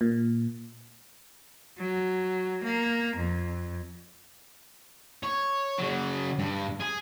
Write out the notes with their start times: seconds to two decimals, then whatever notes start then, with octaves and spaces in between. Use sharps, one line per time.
0.01 A#2
1.78 F#3
2.64 A#3
3.17 F2
5.23 C#5
5.79 C#3 F#3
6.39 G2
6.80 G#4